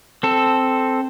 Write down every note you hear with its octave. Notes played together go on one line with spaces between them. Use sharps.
C4 A4